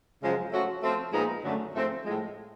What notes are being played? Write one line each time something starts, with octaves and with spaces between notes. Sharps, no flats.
F#2 C#3 F3 G#3
F3 A3 C#4 F#4
F3 A3 C4
A#2 F3 G#3 B3 D#4
F#2 D3 F#3 A3
G#2 F3 A3 C4
A2 F3 G#3